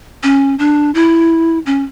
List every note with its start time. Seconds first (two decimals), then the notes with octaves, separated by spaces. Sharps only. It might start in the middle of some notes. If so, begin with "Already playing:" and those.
0.23 C#4
0.59 D4
0.95 E4
1.66 C#4